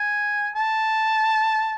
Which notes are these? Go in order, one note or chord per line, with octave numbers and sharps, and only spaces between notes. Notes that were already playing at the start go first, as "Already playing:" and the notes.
Already playing: G#5
A5